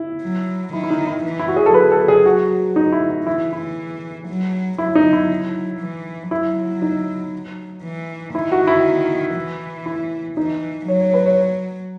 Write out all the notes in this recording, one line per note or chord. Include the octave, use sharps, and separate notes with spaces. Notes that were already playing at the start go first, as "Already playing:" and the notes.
Already playing: E4
F#3
D#3 E4
E4
D#4
E4
E3
E4
F#4
G#4
A4
F#3 B4
A4
G#4
F#4
D#4
E4
E4
E3 E4
E4
F#3
F#3 E4
D#4
E4
E3
F#3 E4
D#4
E3
D#3 E4
F#4
E4
E3
E4
E3 D#4
F#3 C#5
C#5
B4
C#5